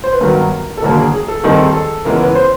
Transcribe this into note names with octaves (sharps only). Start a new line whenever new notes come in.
C5
B4
G2 D#3 F#3 B3 A#4
A4
E1 D#2 D3 F#3 A#3 A#4
G#4
G#4
A4
D#2 D#3 G3 C4 D#4 A#4
A4
G#4
A4
C#2 C#3 E3 G#3 B3 A#4
B4
C5